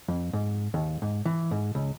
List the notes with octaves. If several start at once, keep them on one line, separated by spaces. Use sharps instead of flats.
F2
G#2
D#2
G#2
E3
G#2
C#2